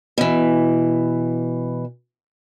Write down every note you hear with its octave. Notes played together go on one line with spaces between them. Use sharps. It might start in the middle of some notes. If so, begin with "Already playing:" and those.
B2 E3